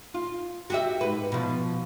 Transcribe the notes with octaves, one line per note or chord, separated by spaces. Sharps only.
F4
F#4 G4 E5
G#2 B4
B2 F3